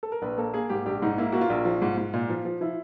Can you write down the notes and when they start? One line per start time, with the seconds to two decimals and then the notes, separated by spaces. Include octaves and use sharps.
0.03 A4
0.12 A#4
0.22 A#1 B4
0.37 A#3 A4
0.54 A#3 G#4
0.70 G#2 G4
0.86 A#1 G4
1.02 G#2 D#4
1.18 A#3 E4
1.32 A#3 F#4
1.41 F4
1.50 A#1
1.65 F3
1.81 G#2
1.97 G#2
2.13 A#2
2.29 F3
2.45 F3
2.61 F3 E4